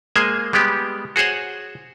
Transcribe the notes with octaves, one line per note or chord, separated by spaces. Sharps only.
G#3 A#3 G#4 C5 G#5
G3 G#3 B3 G4
F#4 G#4 C5 C#5 F#5